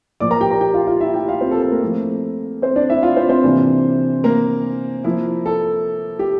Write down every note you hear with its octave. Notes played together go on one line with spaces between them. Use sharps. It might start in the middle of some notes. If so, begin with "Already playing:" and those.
A#2 F3 A#3 D5 D6
A#4 A#5
G4 G5
A#4 A#5
G4 G5
F4 F5
F4 F5
E4 E5
G4 G5
F4 F5
C4 C5
A4
A#4
A4
A#3 A#4
F3 A3 C4 E4
C4 C5
D4 D5
E4 E5
F4 F5
C4 C5
C4 C5
C3 E3 A#3 D4
A#3 A#4
F3 A#3 E4
A4
G4